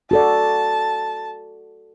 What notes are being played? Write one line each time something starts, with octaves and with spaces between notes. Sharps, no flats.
F#4 A4 D5 A5